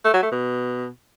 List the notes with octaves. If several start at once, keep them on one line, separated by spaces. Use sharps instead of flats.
A3
F#3
A3
B2